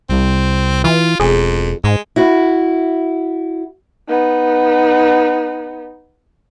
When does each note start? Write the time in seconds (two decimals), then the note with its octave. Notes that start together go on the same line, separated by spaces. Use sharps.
0.10 C2 C4
0.84 E3 F4
1.20 E1 F2 G#4
1.84 G#2 G#3
2.16 E4 F#4
4.08 B3 D#4